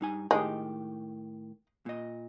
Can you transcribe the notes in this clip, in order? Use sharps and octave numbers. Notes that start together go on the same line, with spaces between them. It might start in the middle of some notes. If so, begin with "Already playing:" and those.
G2 D#4 G#5
A2 D#3 G#3 G4 D#5
A#2 D#5